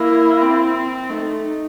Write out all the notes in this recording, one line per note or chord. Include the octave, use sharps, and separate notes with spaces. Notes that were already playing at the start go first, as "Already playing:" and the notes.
Already playing: A#3 E4
C4
A3 D#4
D#4